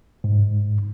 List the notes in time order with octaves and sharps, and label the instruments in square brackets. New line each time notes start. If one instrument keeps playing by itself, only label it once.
[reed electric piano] G#2